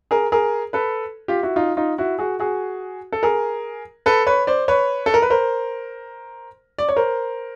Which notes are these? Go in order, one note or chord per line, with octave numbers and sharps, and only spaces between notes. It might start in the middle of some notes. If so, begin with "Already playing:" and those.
G#4 A#4
G#4 A#4
A4 B4
F4 G4
E4 F#4
D#4 F4
D#4 F4
E4 F#4
F#4 G#4
F#4 G#4
A4
G#4 A#4
A4 B4
B4 C#5
C5 D5
B4 C#5
A4
A#4
B4
A#4 C5
D5
C#5
A#4 C5